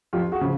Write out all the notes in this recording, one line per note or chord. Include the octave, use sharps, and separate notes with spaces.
F2 F4 G4
F#4 G#4
C#3 F3